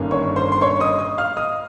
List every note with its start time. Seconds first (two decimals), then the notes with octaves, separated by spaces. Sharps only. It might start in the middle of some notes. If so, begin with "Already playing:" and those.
Already playing: G1 G2 D#3 A#3 C#4
0.11 C#5 C#6
0.36 C5 C6
0.52 C6
0.61 C#5 C#6
0.80 D#5 D#6
0.99 D#5 D#6
1.18 F5 F6
1.37 D#5 D#6